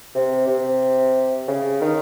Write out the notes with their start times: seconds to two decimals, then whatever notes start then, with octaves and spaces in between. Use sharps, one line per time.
0.15 C3
0.48 C3
1.48 C#3
1.81 D#3